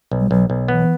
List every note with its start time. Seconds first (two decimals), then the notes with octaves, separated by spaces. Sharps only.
0.12 B1
0.20 G3
0.31 B1 F#3
0.50 B1
0.68 E3 B3